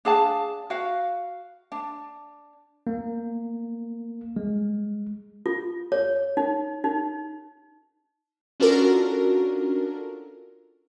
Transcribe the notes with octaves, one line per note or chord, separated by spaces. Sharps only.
D4 G#4 F5 A5
F#4 B4 F5
D4
A#3
G#3
F4
C#5
D#4
D#4
C#4 D4 F4 F#4 A4 A#4